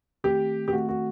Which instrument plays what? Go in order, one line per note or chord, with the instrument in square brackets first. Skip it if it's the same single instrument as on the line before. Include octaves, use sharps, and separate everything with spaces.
[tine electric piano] D#3 A3 C4 [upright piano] G4
[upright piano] G4
[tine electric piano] D#3 A3 C4 [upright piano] F#4
[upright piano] F#4